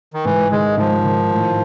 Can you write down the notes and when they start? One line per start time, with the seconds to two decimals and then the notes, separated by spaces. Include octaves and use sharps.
0.14 D#3
0.24 G#2 E3
0.51 D#3 G#3
0.77 G#2 F3
1.04 D#3
1.31 A2